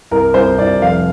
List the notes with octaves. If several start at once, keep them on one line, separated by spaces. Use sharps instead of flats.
C2 A#4
C2 C5
C2 D5
F1 F5